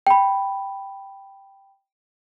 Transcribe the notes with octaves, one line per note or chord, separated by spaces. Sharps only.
G5 B5